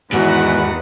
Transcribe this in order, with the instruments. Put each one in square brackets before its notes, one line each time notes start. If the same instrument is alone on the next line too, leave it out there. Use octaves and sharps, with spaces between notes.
[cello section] E2 [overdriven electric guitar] G#2 [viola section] D#3 B4 F#5 [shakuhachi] F#4